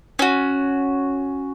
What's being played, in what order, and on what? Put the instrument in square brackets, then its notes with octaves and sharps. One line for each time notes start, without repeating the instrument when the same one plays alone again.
[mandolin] C#4 F#4